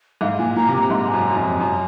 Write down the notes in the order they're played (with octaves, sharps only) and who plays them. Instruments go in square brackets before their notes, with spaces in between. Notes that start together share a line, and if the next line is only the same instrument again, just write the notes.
[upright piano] G#2 [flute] F5
[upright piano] A#2 [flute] G#5
[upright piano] A#2 [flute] A#5
[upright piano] C3
[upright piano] A#2 [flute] A#5
[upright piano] G#2 [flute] C6
[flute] A#5
G#5
[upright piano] F#2 [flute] A#5
[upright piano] F#2
F2
[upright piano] F#2 [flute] A#5